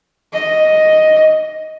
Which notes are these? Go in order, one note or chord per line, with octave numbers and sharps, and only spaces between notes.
D#5